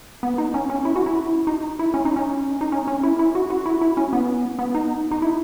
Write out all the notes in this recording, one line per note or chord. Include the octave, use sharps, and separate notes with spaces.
B3
D#4
C#4
C#4
E4
F#4
E4
D#4
E4
C#4
D#4
C#4
D#4
C#4
C#4
E4
E4
F#4
F#4
E4
E4
C#4
B3
B3
D#4
D#4
E4